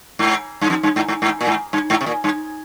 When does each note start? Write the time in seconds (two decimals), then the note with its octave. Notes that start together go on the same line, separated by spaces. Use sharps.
0.19 G#2
0.61 G2
0.70 F2
0.83 G2
0.96 G#2
1.08 G#2
1.22 G#2
1.41 A#2
1.47 G#2
1.73 G2
1.90 G#2
2.01 C3
2.06 A#2
2.24 G2